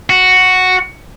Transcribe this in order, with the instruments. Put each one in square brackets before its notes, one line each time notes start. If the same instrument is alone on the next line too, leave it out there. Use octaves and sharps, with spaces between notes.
[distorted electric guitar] F#4